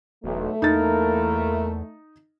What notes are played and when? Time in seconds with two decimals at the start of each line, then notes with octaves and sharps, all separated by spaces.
0.24 E1 B1 A3
0.62 E2 A#3 D#4 E4 A#4 A6